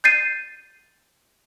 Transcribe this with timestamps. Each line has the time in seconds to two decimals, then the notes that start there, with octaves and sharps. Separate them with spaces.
0.04 G6 A6 C7 D#7